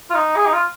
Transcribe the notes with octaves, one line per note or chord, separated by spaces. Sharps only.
F4
D#4
G#4
D#4
F4